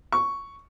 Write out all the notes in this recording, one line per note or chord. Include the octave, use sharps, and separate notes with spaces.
C#6